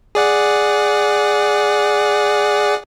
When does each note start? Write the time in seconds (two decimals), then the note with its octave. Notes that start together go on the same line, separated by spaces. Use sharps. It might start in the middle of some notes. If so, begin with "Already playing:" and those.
0.15 G#4 D5 F#5